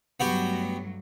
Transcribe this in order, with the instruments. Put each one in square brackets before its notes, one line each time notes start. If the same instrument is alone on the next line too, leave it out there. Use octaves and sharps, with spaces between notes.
[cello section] G2 F#3 A3 [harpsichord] B3 F#4 G4